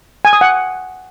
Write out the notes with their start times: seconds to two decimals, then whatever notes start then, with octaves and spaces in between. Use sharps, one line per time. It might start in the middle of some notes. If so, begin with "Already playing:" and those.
0.25 G#5
0.33 D#6
0.41 F#5